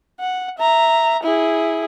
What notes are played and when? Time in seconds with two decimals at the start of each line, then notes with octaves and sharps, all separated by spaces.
0.20 F#5
0.58 E5 A#5
1.23 E4 G#4